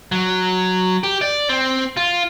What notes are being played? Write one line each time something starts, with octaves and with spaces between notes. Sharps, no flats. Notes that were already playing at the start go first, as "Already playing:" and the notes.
F#3
G4
D5
C4
F4